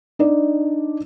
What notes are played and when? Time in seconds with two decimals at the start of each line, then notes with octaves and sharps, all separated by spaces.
0.19 D4 D#4 D5